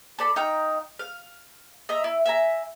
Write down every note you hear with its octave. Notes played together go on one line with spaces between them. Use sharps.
A4 D5 B5
D#4 F5 G5 A#5
F5
D#5 E5 A#5
E4
E5 G#5 A#5